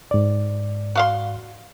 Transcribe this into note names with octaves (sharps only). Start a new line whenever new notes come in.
G#2 D5
F#4 F5 C6